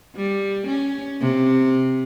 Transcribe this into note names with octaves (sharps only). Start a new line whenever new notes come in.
G3
C#4
C3